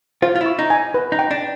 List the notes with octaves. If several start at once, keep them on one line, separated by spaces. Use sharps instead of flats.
F4 C5
F4
E4
C#6
D#4
G#5
B4
D#4
G5
D4